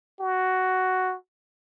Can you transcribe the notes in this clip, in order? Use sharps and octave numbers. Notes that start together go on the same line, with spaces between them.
F#4